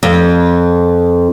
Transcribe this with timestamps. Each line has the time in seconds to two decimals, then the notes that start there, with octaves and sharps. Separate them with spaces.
0.03 F2